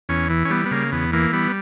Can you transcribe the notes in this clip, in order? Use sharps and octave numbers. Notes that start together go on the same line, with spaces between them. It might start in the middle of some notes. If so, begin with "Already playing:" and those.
E2 C#4
E3
C#4
G3 B3
B3
C#3 A#3
E2 B3
E3 A#3
G3 B3